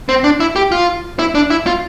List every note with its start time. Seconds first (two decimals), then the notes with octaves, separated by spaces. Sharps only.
0.09 C4
0.24 D4
0.40 E4
0.56 G4
0.72 F4
1.19 E4
1.35 D4
1.50 E4
1.66 F4